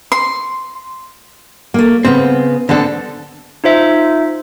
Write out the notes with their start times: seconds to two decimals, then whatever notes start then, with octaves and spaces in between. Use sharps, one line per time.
0.12 C6
1.74 A3 A#3
2.05 C#3 B3 C4
2.69 D3 B3 C4 D4 A4
3.64 D#4 F4 C5 E5